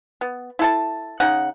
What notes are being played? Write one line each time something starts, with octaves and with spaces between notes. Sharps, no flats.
B3
E4 A4 A5
C#3 D#4 F#5